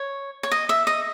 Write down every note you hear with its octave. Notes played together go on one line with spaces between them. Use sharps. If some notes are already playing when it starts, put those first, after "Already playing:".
Already playing: C#5
C#5
D#5
E5
D#5